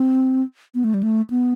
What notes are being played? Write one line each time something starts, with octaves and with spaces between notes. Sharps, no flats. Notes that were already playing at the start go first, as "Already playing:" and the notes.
Already playing: C4
B3
A3
G3
A3
B3